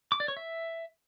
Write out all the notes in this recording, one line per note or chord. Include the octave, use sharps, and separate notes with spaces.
D6
D5
C#5
E5